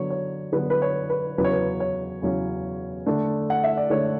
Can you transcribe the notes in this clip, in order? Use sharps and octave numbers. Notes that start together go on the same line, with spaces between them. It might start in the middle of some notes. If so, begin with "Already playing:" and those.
Already playing: D3 F#3 B3 C#5
C#5
D3 F#3 B3 B4
B4
C#5
B4
E2 C#3 F#3 C#4 B4
C#5
B4
C#5
E2 C#3 F#3 C#4
D3 A3 D4
F#5
E5
D5
D3 A3 D4 C#5